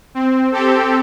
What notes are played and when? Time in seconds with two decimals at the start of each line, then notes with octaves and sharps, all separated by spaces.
0.15 C4
0.52 C4 G4 A4